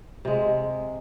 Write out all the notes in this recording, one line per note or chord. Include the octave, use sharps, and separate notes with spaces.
C3 G#3